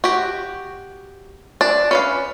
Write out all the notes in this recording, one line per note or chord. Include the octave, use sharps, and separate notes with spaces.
F#4 G4
D4
C#4 B4 F5